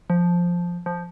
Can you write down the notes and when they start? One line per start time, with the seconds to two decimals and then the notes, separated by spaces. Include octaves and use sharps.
0.10 F3
0.86 F3